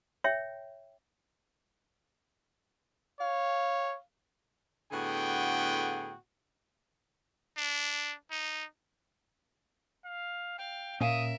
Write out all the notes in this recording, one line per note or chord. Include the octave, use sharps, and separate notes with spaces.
C#5 E5 G5
C#5 F5
A2 D3 B3 F#4 G#4 G5
D4
D#4
F5
F5 G5
A#2 C#4 A#4 E5 F5 G#5 D#6